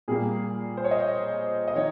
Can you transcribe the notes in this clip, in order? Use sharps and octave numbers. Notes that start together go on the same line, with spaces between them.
A#2 G3 A#3 G#4
C5
C#5
D#5
D#5
D#3 C#5